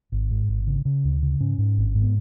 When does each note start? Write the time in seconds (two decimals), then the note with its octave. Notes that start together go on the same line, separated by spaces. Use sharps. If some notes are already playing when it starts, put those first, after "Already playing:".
0.12 G#1
0.31 G#2
0.49 G#1
0.67 C#3
0.85 C#3
1.04 D2
1.22 C#3
1.40 G#2 C#4
1.58 G#2
1.78 G#1
1.95 G#2
2.02 B3